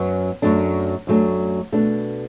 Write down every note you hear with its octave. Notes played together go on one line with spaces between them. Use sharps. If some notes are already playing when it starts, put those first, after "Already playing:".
Already playing: F#2 F#3 B3
F#2 F#3 A3 D4
F#2 F#3 A3 D4
B2 A3 D4